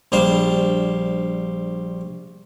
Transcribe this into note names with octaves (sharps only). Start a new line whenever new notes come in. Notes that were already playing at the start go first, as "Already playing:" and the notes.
A#1 G3 D4 C5 F5